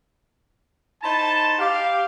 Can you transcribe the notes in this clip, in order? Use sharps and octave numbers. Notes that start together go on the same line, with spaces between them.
D#4 E4 C5 A5
G4 F5